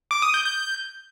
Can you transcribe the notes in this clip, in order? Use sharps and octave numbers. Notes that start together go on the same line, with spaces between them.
D6
D#6
G6
G6